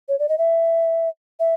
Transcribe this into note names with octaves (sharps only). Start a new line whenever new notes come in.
C#5
D5
D#5
E5
E5